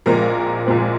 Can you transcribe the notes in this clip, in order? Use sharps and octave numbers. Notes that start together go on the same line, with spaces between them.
A#1 A#2 F3 G#3 C4 A#4 A#5
A#1 A#2 F3 G#3 C4